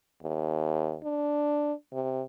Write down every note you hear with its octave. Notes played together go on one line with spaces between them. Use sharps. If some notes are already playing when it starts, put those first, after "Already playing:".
D#2
D4
C3